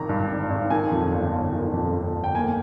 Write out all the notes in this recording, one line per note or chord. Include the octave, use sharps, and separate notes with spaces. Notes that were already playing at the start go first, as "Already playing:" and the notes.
Already playing: G#1 D#3 A#5
G2
G#1
G#1
D#3 G#5
F2
G1
G1
D#3
F2
G1
G1
G5
A#3 G#5